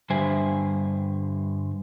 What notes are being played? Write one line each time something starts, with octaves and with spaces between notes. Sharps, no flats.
G2 D3 G3 C5 E5 G#5